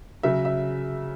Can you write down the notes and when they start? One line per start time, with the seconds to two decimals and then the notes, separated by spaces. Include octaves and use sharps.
0.23 C#3 F#3 E5
0.45 E5